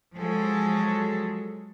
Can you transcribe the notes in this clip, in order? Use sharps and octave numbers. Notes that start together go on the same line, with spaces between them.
F3 F#3 G#3 G#4 A4